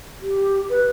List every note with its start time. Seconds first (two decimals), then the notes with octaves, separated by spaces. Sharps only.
0.22 G4
0.70 B4